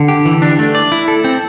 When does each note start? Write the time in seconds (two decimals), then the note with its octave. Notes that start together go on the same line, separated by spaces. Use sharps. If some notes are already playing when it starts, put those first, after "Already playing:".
Already playing: D3
0.08 G4
0.25 E3
0.42 D4
0.59 A3
0.75 D5
0.92 E4
1.08 A4
1.24 C4